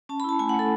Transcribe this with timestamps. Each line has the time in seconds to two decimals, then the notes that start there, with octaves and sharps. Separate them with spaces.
0.09 C#4 A5
0.20 B5
0.24 E4 A5
0.39 A3 G#5
0.49 F#5
0.54 A3
0.59 A4